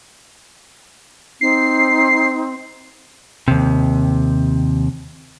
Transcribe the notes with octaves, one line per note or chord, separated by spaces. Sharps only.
C4 D#4 C7
D#2 C3